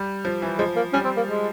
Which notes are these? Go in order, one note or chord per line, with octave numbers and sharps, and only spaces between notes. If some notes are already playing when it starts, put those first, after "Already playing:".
Already playing: G3
F3
E3
F3 G#3
A#3
G3 C#4
C4
A#3
G#3